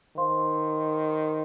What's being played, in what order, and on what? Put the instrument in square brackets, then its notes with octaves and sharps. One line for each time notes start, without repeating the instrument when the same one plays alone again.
[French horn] D#3 [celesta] C5 F5 C6